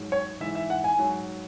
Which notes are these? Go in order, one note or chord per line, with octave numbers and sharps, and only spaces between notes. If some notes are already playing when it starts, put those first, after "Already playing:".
Already playing: G#2 F#3
C#5
G#2 E3 E5
E5
F#5
G#5
G#2 F#3